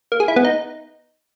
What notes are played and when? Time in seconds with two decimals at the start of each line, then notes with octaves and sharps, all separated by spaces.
0.12 A#3
0.20 G#4
0.28 E4
0.36 B3
0.45 D#4